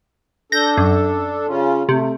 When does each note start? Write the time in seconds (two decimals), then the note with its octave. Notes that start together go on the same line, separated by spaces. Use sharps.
0.52 D4 A4 G6 A#6
0.77 F#2
1.48 C#3 C#4 F4
1.89 C3 A3